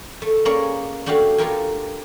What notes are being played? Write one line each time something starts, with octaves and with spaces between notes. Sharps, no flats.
A3
A#3 C#4 G#4 C#5 D5
A3 D4 F#4 G4 F5
F4 G4 A4 A#4 G5 G#5